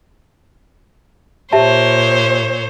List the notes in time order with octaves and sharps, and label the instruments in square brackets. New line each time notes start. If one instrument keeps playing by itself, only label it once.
[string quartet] A#2 C5 C#5 [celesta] G4 E5 A5